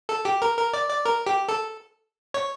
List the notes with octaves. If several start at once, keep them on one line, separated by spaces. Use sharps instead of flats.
A4
G4
A#4
A#4
D5
D5
A#4
G4
A4
C#5